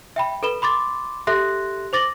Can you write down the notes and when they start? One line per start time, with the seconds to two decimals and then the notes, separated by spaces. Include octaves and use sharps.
0.16 E5 G5 B5
0.43 A4 B4 B5 E7 G7
0.62 B5 C6 D6 A6
1.27 G4 A4 E5 C6 F#6 A#6
1.93 C5 D6 A6 A#6 F#7